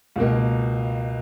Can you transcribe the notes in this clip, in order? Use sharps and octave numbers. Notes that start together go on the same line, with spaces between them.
C#2 B2 A#3